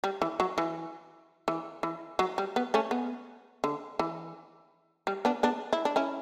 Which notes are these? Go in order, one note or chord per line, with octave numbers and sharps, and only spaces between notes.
G3
E3
F#3
E3
E3
E3
F#3
G3
B3
A3 C#4
B3
D3
E3
G3
B3 D4
B3 D4
E4
D4
C#4 E4